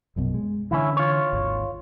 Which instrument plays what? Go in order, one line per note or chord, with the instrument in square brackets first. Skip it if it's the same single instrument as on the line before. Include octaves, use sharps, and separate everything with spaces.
[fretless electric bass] A#1 F#2 B2
G#3
[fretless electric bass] D3 E3 [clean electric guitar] C#4 E4
[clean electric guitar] F4 C#5
[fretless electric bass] G#1 D#2